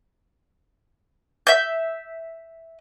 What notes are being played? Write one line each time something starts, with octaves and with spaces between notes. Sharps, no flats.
E5 G6